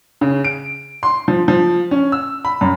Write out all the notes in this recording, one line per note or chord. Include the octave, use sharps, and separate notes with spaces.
C#3
D7
C6
F3
F3
C#4
E6
B5
F#2